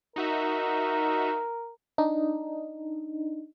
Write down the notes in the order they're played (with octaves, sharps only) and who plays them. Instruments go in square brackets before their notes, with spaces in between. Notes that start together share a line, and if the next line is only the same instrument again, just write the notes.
[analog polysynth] D#4 F#4 E5 [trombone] A#4
[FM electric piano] D4 D#4